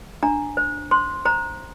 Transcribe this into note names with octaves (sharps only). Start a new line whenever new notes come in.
D4 A#5
C5
C5 C6
C5 A#5